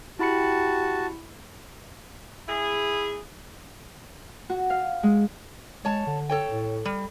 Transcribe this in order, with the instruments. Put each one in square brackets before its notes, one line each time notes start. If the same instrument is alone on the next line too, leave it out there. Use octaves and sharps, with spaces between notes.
[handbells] E4 B5 C#7 [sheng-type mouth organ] F#4 A5 [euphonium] G4
[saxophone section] E4 G#4
[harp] F#4
F5
G#3
[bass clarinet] G#3 [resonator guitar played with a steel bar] C#5 A5
[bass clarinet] D3
[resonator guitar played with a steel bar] A4 C#5 G5
[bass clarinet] A2
[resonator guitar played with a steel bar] G3